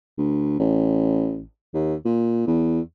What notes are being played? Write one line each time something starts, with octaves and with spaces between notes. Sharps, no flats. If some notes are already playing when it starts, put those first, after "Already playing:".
D2
A1
D#2
A#2
E2